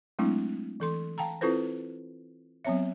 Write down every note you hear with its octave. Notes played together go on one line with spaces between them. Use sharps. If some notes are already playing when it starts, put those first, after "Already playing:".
F#3 G#3 A3 C4 D4 E4
E3 A4 C6
F5 G5 A5 A#5
C4 E4 F4 A4 B4 C5
F#3 B3 C4 C#5 E5